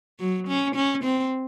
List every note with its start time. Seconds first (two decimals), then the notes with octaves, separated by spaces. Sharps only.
0.20 F#3
0.48 C#4
0.75 C#4
1.04 C4